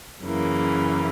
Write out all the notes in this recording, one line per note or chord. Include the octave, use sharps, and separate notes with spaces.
F#2 C#3 E3 A#3